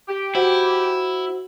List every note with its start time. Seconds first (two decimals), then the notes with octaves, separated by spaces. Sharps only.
0.09 G4
0.35 E4 F#4 C5 F#5